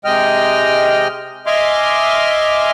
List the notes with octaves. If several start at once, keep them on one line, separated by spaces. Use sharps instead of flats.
C3 G#3 D#5 G5 F6
D#5 E5 G#5 C6 D6 F6